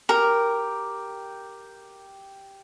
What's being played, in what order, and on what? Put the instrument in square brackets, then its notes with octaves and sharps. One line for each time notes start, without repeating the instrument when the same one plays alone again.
[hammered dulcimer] G4 [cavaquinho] A#4